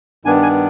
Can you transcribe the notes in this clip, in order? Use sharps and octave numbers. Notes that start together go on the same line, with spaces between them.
G2 D#3 B3 D4 G#5
G#5